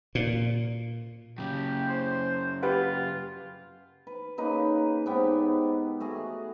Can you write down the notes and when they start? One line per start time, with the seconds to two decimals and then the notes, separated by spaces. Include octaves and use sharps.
0.15 A#2
1.38 F#2 C#3 G4
1.88 C5
2.63 F4 G4 B4 F#5
4.07 B4
4.38 C#3 A#3 D#4 B4
5.06 G#2 B3 G4
6.00 A3 F#4 G#4